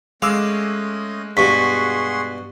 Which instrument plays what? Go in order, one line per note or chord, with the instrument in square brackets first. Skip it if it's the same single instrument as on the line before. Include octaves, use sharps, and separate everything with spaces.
[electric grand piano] G#3 D6 E6 [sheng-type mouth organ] A3 C#4 D#5 [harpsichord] F5
[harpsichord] G2 B2 [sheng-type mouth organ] F#4 G#4 C6 [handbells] C#6 B6